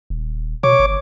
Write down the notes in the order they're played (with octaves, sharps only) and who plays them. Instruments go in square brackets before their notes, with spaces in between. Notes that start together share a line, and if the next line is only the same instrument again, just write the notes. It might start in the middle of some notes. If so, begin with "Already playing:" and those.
[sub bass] D#1
[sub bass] B2 [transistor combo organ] C#5 D6
[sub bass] G1